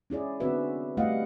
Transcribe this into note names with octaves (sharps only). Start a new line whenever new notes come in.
C#4 E4 G#4 D5
D3 B3 C4 F#4 B4 E5
G3 A3 E4 D#5 F5 F#5